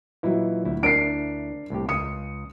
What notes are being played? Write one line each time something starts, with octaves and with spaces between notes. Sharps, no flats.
A#2 E3 F#3 D#4 E4
D2 E4
D4 A#4 C7 D7
C2 A2 G4
C#2 D#6 C#7